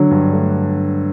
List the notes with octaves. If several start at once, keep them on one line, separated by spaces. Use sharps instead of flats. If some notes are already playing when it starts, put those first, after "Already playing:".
Already playing: D3 F#3
G2
A3